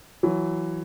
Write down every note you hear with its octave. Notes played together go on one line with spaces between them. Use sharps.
E3 F#3